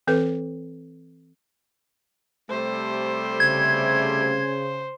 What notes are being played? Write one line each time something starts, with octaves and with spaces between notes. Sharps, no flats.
E3 C4 A4 B4
C3 G3 A3 C5
C#3 G#6